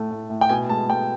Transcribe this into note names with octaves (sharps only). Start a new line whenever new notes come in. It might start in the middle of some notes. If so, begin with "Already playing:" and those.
Already playing: A2 A3
A2
A2
G5
B2 G#5
G#3 A5
G#3 G5